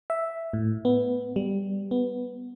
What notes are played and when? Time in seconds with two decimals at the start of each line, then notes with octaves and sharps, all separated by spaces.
0.10 E5
0.53 A2
0.85 B3
1.36 G3
1.91 B3